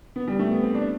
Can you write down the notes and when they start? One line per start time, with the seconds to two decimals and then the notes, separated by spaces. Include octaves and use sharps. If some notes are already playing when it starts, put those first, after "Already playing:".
0.16 B3
0.28 G3
0.39 A3
0.51 B3
0.63 C4
0.75 D4